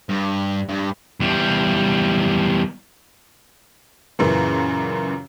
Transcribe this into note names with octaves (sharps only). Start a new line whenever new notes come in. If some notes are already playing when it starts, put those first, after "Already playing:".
G2
G2
E2 G3
F#2 A#2 C#3 E3